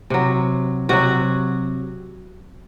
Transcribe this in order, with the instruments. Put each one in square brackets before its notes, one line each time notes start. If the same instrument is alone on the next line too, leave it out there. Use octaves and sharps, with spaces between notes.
[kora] C3 F#3
C3 F#3 F#4